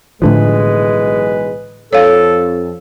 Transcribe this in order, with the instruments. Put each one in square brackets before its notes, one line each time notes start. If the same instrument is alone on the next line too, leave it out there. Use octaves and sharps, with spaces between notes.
[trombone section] B1 E3 G#3 [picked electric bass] A2 D3 F3 [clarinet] B4
[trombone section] F2 [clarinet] A4 [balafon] C#5 F5